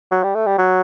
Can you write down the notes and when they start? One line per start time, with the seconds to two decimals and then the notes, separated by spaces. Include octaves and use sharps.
0.12 F#3
0.23 G3
0.35 A3
0.46 G3
0.58 F#3